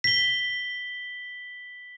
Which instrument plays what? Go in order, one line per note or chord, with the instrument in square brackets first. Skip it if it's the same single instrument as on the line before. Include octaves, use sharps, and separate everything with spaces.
[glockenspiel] B6 G7